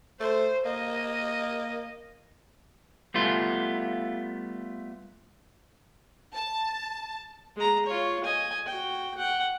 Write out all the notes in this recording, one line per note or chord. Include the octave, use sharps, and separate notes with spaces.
A3 C5
A#3 D#5
G3 A3 B3 F4
A5
G#3 A#5
F4 C#5
D#5 G#5
F#4 G5
F#5 G5